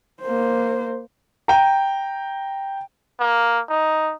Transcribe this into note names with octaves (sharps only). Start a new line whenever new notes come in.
A#3 C5
G5 A#5
A#3
D#4